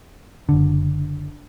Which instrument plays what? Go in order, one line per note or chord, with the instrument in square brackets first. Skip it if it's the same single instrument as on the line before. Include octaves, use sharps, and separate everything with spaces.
[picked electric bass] F#1 D3